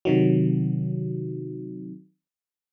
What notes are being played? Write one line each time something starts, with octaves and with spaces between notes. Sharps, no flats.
C3 D#3 F#3